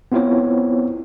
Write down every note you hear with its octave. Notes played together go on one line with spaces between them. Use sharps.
B3 C4 E4 F4 C5 C#5